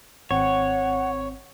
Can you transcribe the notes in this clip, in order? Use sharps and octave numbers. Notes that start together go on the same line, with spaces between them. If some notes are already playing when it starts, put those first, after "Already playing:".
G#1 C4 C#5 F#5